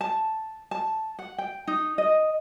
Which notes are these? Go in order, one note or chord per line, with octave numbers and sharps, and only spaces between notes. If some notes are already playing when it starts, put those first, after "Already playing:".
A5
A5
F#5
G5
D#4
D#5